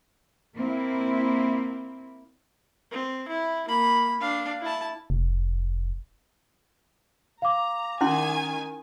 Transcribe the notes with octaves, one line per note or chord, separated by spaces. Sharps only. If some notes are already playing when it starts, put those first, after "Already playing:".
A#3 C4 E4
C4
E4
A#3 B5
D4 F5
E4 A5
F1
F5 A#5 D6
D#3 C#4 E4 G#5 C6